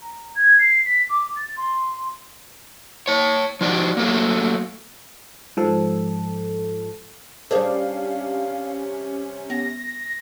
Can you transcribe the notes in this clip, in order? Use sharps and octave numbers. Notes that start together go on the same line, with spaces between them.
A#5
G#6
C7
B6
D6
A6
C6
C#5 A5
F3 D#4 F#4 D5
F#3 A3 A#3
G#2 F3 A4
C3 G3 C#4 D4 G#4 A#4 C5 F5
B3 A#6